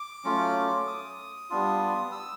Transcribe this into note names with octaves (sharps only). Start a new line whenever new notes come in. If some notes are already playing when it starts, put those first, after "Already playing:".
Already playing: D6
F#3 A3 C#4 F4
D#6
G3 B3 D4 F4
E6